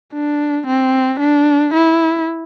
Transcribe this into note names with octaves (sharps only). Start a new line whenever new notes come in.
D4
C4
D4
E4